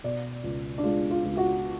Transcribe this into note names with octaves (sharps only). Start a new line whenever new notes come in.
B2 D5
C#2
D4
G#3 F4
F4
C#2
F#4